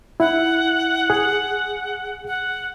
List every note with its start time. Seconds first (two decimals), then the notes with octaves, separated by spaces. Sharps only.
0.20 E4 F#5
1.10 G#4
2.27 F#5